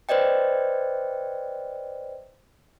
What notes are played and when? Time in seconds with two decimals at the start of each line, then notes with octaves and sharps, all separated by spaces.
0.09 B4 C5 D5 D#5 G5